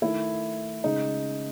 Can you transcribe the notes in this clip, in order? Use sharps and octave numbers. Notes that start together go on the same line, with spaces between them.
D#3 A3 E4
C#3 G#3 D#4